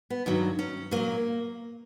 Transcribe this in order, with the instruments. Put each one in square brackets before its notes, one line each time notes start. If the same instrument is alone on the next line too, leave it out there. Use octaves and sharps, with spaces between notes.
[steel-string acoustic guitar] B3
G2 D#3 F#3
C#4
A#2 F#3 A#3